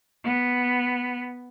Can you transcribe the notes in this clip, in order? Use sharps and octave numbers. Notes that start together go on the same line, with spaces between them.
B3